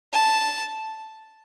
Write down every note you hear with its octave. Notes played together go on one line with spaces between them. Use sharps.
A5